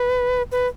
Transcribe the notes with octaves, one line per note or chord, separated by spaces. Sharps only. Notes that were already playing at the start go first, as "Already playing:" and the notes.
Already playing: B4
B4